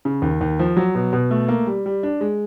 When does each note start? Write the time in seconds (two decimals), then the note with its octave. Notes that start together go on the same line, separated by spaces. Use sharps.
0.05 C#3
0.22 D#2
0.41 D#2
0.59 F3
0.77 F#3
0.95 B2
1.13 B2
1.31 A3
1.48 A#3
1.67 G3
1.86 G3
2.03 D4
2.21 G#3